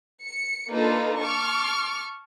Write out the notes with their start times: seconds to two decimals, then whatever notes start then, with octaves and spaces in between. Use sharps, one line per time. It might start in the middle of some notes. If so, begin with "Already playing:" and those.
0.24 C#7
0.70 A#3 D4 D#4 F4 A4 B4
1.20 A5 C#6 D6 F6